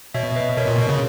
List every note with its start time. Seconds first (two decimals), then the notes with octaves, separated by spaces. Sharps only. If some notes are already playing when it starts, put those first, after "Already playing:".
0.14 B2 C#5 E5
0.35 B4 D#5
0.57 B2 A#4 C#5
0.67 A#2
0.78 B2
0.89 C#3